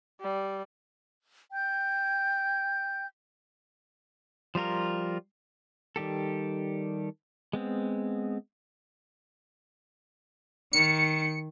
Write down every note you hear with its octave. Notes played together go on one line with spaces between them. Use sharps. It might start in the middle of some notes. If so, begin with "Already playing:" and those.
G3
G5 G6
F3 G3 F4 A#4
D#3 G3 G4 A4
G#3 B3 C4
D#3 C#7